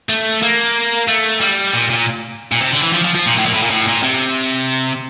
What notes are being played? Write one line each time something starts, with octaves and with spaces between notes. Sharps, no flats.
A3
A#3
A3
G3
A#2
A#2
A#2
C3
D3
E3
F3
F3
F3
A#2
A2
A#2
A2
A#2
A2
A#2
C3